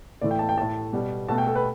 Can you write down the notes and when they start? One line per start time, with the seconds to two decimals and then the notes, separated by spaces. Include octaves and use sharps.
0.21 A2 E3 A3 D5
0.31 G5
0.39 A5
0.49 G5
0.57 A2 A3 A5
0.93 B2 G3
1.28 B2 A3 A5
1.38 G5
1.47 A4
1.55 B4